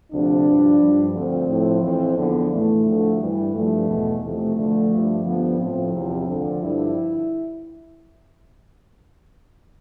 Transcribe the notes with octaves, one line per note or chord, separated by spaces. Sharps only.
D2 C3 F3 D4
G2 F3
G2 F3
D2 D3 F3 C4
A2 F3
F2 E3 C4
E2 D3 F3 B3
A2 E3 A3
D2 D3 F3
G2 E3 G3
G2 F3 A3
E2 B2
F2 C3 E3 A3
D2 D3 F3 A3
G2 F3
G2 D3 F3 B3
A2 F3 C4
E2 C3 F3
D2 D3 F3
G2 D3 F3 E4